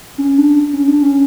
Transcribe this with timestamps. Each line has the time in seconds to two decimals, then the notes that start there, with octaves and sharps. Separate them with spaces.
0.18 C#4
0.38 D4
0.73 C#4
0.88 D4
1.02 C#4